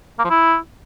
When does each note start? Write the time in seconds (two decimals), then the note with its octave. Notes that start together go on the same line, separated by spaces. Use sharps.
0.19 A#3
0.24 F3
0.30 E4